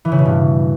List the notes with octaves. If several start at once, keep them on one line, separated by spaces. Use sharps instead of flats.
E3
C#3
B2
G2